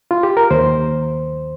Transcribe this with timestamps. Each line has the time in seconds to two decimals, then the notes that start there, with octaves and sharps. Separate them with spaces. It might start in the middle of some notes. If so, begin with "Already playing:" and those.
0.11 F4
0.23 G4
0.37 A#4
0.51 D#2 C5